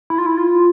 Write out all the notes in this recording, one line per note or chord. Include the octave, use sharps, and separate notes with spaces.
E4
F4
E4
F4